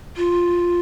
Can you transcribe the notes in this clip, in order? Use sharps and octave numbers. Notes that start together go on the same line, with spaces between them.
F4